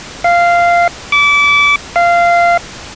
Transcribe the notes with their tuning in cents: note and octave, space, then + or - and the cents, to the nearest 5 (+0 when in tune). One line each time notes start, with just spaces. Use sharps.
F5 -10
D6 -30
F5 -15